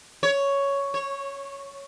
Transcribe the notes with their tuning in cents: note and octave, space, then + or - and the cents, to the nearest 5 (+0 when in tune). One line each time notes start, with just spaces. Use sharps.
C#5 +5
C#5 -15